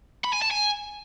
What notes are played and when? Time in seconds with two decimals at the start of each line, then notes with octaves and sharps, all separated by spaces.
0.24 B5
0.33 G#5
0.42 A5
0.51 G#5